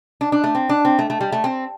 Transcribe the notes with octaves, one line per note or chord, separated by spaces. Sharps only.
D4
D4
A3
C4
D4
C4
A3
A3
G3
A3
C4